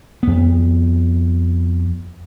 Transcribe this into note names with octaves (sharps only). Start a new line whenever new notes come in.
F2 B3